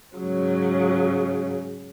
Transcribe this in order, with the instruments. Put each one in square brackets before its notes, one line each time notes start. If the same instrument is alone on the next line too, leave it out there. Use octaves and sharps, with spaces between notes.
[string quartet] G#2 C#3 F#3